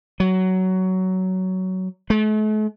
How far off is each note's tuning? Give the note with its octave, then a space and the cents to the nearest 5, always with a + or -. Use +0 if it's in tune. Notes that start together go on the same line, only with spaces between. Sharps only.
F#3 +15
A3 -45